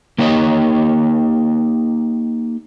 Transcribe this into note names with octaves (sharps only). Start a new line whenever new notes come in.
A#3 D#4 G4 C#5 D#5